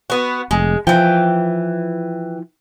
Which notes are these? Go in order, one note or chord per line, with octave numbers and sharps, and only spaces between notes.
B3 F#4
F1 G#3
E3 F3 G5